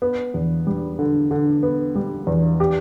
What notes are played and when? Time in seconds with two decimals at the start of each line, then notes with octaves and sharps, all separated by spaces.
0.02 B3
0.34 E2
0.67 G3
0.99 D3
1.31 D3
1.63 B3
1.95 G3
2.27 E2
2.60 G4